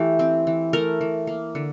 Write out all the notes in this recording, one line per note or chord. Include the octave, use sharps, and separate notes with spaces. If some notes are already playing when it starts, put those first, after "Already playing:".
Already playing: E3 A3 G4
C4
E3
A3 A#4
E3
A#3
D3